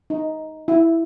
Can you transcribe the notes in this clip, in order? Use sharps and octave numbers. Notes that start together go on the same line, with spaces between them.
D#4
E4